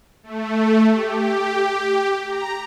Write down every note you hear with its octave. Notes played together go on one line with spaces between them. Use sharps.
A3
G4
A#5